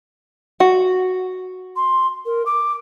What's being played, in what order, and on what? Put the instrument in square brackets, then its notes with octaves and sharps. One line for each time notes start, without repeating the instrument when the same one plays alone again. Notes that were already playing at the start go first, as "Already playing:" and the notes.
[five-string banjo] F#4
[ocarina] C6
A#4
D6